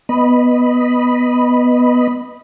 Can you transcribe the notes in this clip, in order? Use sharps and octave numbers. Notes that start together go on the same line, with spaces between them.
B3 D#5 B5